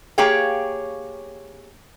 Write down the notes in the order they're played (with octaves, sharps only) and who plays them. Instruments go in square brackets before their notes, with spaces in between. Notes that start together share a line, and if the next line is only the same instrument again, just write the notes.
[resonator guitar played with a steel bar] A#3 G4 G#4 C#5 F5 G5